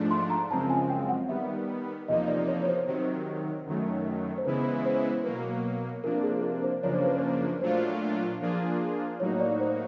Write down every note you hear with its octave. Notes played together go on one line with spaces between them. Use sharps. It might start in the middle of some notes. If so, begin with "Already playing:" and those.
Already playing: G#2 F3 A3 D4
C6
A#5
F#2 C#3 F3 G#3 C4 A5
G#5
G5
F#5
D#3 G3 B3 E5
E2 C3 F3 A#3 D#4 D#5
D5
C#5
C#5
C5
C3 D#3 F#3 C5
F#2 D#3 F#3 A3
C5
C#3 E3 G#3 B3 E4 B4
C5
B2 F#3 A#3 B4
C3 F3 A#3 D4 A#4
G#4
A#4
C5
F#2 C#3 F3 A#3 D4 C#5
C5
B4
C5
A#2 F#3 A3 D4 F4 C5
F3 A#3 D4 F4 G#4
A2 F#3 A#3 D#4 F#4 C#5
D5
C5